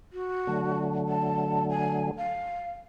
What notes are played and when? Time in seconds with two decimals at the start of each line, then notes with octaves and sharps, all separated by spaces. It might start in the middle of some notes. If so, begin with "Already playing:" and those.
0.13 F#4
0.47 D3 F#3 A3
1.09 A5
1.70 G#5
2.18 F5